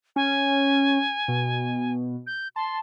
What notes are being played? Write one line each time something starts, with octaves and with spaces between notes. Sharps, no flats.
C#4 G#5
B2
G6
A5 C6